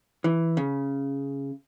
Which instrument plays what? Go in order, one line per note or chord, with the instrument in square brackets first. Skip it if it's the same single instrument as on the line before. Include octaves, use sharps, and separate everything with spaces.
[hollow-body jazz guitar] E3
C#3